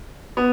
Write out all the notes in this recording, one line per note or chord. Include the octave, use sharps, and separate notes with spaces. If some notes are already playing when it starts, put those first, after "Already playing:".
B3